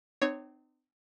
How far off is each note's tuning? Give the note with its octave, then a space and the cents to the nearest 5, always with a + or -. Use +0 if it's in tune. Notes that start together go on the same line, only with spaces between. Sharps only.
C4 -35 D#4 -40 C#5 +0